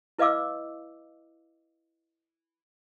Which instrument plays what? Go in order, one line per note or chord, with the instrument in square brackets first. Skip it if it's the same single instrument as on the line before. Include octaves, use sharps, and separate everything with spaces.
[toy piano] E4 B4 D#5 F5 D6 E6